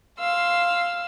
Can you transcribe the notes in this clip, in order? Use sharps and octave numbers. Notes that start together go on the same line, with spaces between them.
F5 C6 E6